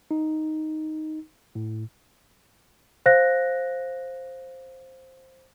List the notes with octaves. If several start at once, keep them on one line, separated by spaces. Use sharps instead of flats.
D#4
A2
C5 F5 F#6 A#6